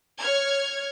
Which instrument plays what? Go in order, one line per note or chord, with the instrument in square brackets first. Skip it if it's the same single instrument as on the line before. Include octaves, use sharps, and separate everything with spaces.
[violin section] C#5 F6 G#6